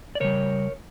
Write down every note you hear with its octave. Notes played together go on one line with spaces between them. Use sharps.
D5
C#3 G3 A#4 C#5